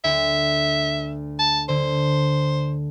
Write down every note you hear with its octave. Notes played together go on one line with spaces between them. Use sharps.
D2 E5
A5
D3 C5